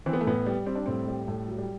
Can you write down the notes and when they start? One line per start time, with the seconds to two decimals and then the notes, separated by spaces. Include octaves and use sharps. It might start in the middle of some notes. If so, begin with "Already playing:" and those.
0.06 E3 C4
0.13 B3
0.21 A3
0.27 A2 B3
0.46 G3
0.66 G3 C4
0.75 D4
0.86 A2 C4
1.08 G3
1.28 A2 A3
1.48 F#3
1.58 G3